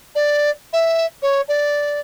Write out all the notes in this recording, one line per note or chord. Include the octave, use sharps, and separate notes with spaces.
D5
E5
C#5
D5